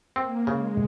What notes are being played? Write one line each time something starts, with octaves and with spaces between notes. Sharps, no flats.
A#3 C4
C#3 G#3